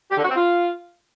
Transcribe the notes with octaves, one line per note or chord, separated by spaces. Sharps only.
G4
D3
F#4
C4
F4